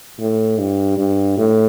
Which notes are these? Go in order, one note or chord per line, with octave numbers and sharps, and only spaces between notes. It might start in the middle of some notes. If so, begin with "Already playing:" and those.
A2
G2
G2
A2